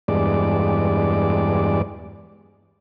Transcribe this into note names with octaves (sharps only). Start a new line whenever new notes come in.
E2 G2 G#3 D5